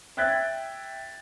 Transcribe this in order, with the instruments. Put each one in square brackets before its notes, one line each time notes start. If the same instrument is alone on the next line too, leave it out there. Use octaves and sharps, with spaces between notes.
[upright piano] E5 G5 F#6 G#6 A6 B6